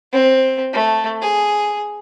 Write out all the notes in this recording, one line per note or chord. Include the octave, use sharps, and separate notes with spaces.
C4
A3
G#4